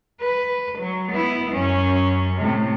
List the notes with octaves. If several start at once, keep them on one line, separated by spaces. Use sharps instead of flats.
B4
F#3
B3 E4
F#2 C#4
A2 C3